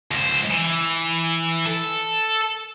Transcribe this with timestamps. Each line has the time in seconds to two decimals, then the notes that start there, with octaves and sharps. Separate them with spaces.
0.11 C#2 C5
0.51 E3
1.66 A4